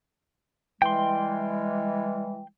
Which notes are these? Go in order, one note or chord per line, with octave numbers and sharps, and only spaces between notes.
E3 G3 G#3 G5 C6